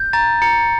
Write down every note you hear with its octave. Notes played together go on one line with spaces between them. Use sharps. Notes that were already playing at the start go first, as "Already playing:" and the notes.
Already playing: G6
A#5 A6
A#5 C#7